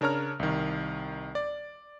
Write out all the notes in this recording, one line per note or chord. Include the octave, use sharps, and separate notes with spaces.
C#3 D4 A#4 C#5 A#5 F6
C2 D#3
D5